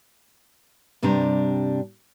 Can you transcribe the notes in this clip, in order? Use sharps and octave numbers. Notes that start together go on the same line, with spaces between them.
G2 C3 G3 D4 A#5